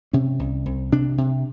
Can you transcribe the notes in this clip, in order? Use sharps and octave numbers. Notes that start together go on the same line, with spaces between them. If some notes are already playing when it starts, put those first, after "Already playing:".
C3 C#4
C2
C2
C3 D4
C3